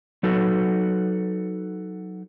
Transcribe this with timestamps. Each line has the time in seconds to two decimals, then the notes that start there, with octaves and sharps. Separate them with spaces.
0.23 F#3 D#4 F#4 A4 B4